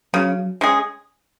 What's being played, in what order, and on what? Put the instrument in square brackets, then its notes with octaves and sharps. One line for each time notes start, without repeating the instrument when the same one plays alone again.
[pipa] C#3 [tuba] F#3
[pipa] G#3 C#4 G#4